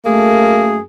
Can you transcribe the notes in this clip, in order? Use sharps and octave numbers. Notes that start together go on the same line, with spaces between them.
F#2 A3 A#3 G#4